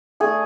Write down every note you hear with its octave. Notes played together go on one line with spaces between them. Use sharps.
A3 D4 G#4